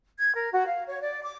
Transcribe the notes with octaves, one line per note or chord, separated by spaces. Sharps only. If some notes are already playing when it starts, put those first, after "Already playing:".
G#6
A#4
F#4
F5
C#5
D5
D6